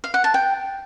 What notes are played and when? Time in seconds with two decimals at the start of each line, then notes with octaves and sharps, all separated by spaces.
0.04 F5
0.14 F#5
0.24 A5
0.34 G5